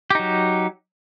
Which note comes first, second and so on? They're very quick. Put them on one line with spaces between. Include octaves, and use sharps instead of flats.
G4 D#4 F#3